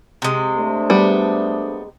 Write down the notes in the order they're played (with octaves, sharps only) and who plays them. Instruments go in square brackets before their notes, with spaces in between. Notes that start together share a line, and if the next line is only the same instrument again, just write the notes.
[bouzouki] C3 G#3
[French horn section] A3 D4 C5
[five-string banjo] G3 B3